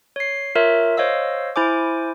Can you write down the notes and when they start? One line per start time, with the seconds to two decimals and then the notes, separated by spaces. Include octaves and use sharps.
0.16 C#5 C7
0.55 F4 A#4 C#5 E5
0.97 C5 C#5 D#5 F5 E6
1.56 E4 C5 G#5 D6